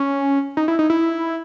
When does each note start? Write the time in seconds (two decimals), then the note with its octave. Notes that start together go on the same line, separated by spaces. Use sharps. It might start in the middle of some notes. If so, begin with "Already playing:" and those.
Already playing: C#4
0.57 D#4
0.68 E4
0.79 D#4
0.90 E4